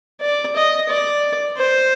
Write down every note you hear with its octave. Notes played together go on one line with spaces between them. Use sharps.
D5
D#5
D5
C5